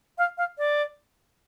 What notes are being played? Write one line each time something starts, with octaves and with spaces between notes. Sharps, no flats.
F5
F5
D5